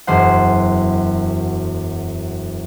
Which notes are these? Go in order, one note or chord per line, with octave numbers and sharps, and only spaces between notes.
E1 F#2 C5 F#5